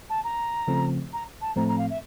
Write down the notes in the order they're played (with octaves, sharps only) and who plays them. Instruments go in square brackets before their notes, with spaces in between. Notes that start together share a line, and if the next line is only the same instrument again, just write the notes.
[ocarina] A5
A#5
[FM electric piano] C#3 F3 A3 C4
[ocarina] A#5
A5
[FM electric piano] A2 F3 A3 C4 [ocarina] A#5
[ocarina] A#5
F5
E5